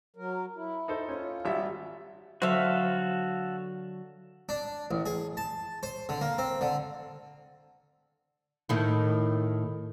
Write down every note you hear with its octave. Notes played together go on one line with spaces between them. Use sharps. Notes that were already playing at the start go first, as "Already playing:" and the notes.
F#3 A#4
E4
D#4 A4 C5
C#4 F4
G#1 G3 E5
D3 F#3 F#4 A4 C5 E5 F5
D4
A1
G#4
A5
C5
D3
A#3
C4
D3
A2 D#3 E4